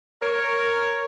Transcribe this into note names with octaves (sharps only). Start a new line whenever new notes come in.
A#4 C#5